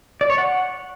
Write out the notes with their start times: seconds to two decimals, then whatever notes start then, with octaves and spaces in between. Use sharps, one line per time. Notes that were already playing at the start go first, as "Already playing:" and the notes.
0.21 D5
0.30 C#5
0.38 F#5